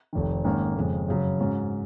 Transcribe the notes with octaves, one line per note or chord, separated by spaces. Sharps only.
F1 F2 D#3
G#2 D#3 A#3 C#4
F2 C#3 G#3
F#2 C#3 F#3
G#2 F#3 C#4